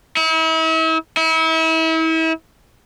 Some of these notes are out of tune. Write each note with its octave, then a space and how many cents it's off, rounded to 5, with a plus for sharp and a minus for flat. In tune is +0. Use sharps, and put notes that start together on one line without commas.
E4 -40
E4 -35